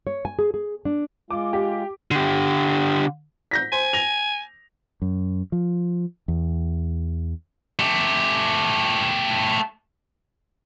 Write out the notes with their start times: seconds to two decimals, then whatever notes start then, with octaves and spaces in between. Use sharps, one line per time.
0.07 C#5
0.25 G#5
0.39 G#4
0.54 G#4
0.85 D4
1.30 G#3 F4 D6
1.53 G4
2.11 D3 G4
3.51 G6 A#6 B6
3.72 C5 G#5
3.93 A#6 F7
5.02 F#2
5.52 F3
6.28 E2
7.79 A3 G4